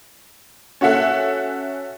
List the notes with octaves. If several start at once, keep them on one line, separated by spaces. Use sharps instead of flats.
C#4 F#4 A4 E5 F#5